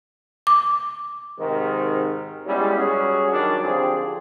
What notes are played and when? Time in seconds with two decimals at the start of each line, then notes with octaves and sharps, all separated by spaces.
0.47 D6
1.38 G#2 C3 D#3
2.46 G3 G#3 B3 C#4 E4
2.77 F#3 G3 C#4 F#4 G#4
3.31 D#3 F#3 G3 D4
3.62 D3 F3 C4 G4 G#4